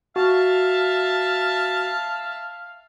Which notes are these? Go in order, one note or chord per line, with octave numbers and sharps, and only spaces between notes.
F#4 E5 F5 A5